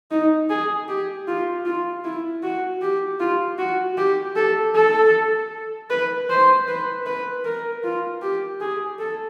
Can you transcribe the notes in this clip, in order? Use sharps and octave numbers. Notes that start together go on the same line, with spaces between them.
D#4
G#4
G4
F4
F4
E4
F#4
G4
F4
F#4
G4
A4
A4
B4
C5
B4
B4
A#4
F4
G4
G#4
A4